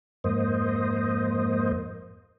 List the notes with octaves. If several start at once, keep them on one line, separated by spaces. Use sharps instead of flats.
F2 G#2 A#3 C5 D#5